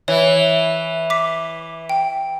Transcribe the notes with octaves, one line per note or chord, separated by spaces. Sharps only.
E3 C#5
D6 B6
G5